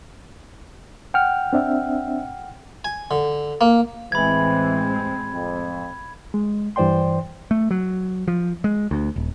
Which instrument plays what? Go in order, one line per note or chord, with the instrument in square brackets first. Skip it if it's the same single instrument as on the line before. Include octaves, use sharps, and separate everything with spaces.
[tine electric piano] F#5 G5 F6
[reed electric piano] C4 D4 E5
[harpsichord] G#5
D3
A#3
[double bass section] A1 G#3 C4 [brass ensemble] E3 [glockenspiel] B5 G#6
[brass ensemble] F2
[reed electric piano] G#3
G2 E3 C5 D5 G5 C6
[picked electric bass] A3
F#3
F3
G#3
D2
D#1